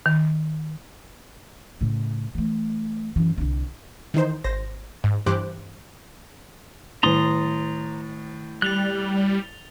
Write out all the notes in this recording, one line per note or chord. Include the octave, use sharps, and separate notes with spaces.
D#3
A2 C#3
E3 A3
F#2 E3
C2 D3
D#3 E3 D#4 C5
G#1 C5 A#6
G#2
G2 E3 G4 C5 D6 F#6
A2 D#3 A#5 C6 D#6 A6
G3 F#6 A6 F7 G7